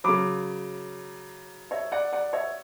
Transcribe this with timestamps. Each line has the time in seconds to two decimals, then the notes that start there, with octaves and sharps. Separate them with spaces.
0.04 C#3 F#3 B5 D6
1.71 C#5 E5
1.92 D5 F#5
2.13 D5 F#5
2.33 C#5 E5